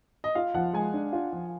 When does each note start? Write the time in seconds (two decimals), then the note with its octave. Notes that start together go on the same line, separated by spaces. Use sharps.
0.24 D#5
0.35 F4 F5
0.54 F3 F#5
0.73 G#3 G#5
0.93 D4
1.13 F4
1.32 F3